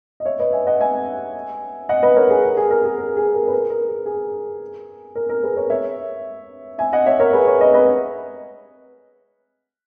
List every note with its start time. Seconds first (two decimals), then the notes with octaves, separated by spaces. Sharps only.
0.20 D#5
0.25 C#5 E5
0.39 B4 D#5
0.53 E5 G#5
0.67 D#5 F#5
0.80 E5 G#5
1.89 D#5 F#5
2.03 B4 D#5
2.16 A#4 C#5
2.30 G#4
2.43 A#4
2.57 G#4
2.71 A#4
2.84 G#4
2.98 A#4
3.17 G#4
3.34 A#4
3.47 B4
3.53 A#4
3.70 A#4
3.88 G#4
4.06 G#4
5.15 A#4
5.29 A#4
5.43 G#4 B4
5.57 A#4 C#5
5.70 C#5 E5
6.78 E5 G#5
6.93 D#5 F#5
7.06 C#5 E5
7.20 A#4 C#5
7.33 G#4 B4
7.47 A#4 C#5
7.60 B4 D#5
7.74 B4 D#5